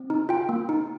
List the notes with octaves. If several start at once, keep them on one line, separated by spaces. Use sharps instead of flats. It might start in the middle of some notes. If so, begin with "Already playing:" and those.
Already playing: C4
D#4
F4 G5
A#3
D#4